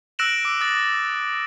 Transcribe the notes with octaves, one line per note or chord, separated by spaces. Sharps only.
E6 F#6 A#6 D7 E7 F#7
D6
D#6 A6